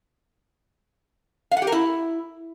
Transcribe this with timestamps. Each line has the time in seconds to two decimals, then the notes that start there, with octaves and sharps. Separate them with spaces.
1.51 F5
1.57 F#5
1.62 G4
1.67 A#4
1.72 E4